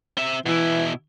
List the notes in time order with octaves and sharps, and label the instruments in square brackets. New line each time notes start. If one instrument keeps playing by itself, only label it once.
[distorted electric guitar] C4 E5
[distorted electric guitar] B2 E4 [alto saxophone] E3